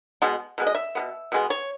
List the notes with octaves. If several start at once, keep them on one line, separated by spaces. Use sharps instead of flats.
B2 G#3 B3
B2 G#3 B3
D#5
E5
B2 G#3 B3
B2 G#3 B3
C#5